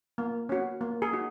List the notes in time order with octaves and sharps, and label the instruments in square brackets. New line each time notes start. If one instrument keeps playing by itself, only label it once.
[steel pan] A#3
C#4 F#4
A#3
G#4
D#4 F#4